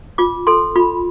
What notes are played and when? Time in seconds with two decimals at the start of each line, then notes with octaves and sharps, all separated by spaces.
0.18 F4 D6
0.47 A4 C6
0.76 F4 B5